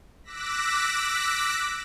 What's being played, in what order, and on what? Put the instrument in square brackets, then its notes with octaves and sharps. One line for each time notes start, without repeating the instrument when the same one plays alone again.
[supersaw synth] D6 E6 F#6 A#6 B6